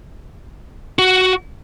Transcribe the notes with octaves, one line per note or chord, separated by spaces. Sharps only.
F#4